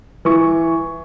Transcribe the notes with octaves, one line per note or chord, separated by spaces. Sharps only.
E3 C#6